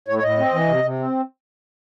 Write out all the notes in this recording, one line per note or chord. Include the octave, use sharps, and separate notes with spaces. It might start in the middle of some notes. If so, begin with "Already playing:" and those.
A2 C#5
C#5
A2 D#5
C4
E3
C3
C3
C4